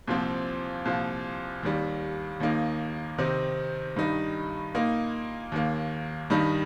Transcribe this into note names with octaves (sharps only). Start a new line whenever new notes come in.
C2 A#2 F3 C4
C2 A#2 F3
D#2 D#3 G3
D#2 D#3 A#3 D#4
C3 D#3 C4 D#4
G2 D#3 G3 D#4
A#2 A#3 D#4
D#2 D#3 A#3
G2 D#3 G3 D#4